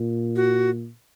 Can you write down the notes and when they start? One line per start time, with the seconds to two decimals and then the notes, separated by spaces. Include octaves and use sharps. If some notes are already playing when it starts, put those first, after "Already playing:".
Already playing: A#2
0.36 F#4